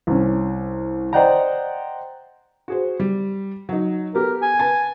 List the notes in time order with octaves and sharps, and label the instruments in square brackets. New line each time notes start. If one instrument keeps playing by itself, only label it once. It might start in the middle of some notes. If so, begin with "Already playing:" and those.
[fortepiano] C2 C#4
C5 D5 D#5 F#5 G5 A#5
[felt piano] F#4 G#4 C5
G3
F#3 D#4
[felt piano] B3 G4 A4 [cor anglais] A#4
[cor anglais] G#5
[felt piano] B4 A5 A6